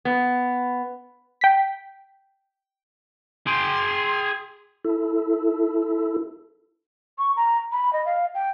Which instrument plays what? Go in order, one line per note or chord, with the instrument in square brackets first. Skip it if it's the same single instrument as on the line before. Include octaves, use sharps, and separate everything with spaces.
[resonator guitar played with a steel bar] B3
[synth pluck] G5 B6
[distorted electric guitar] G#4 G5 [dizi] C6
[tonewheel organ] E4 A4
[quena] C#6
A#5
B5
D#5
F5
G5